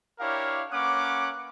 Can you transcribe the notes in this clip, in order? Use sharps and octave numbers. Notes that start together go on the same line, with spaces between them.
D4 E4 G4 A#4 C#5 F5
A#3 C#4 B4 F#5 D6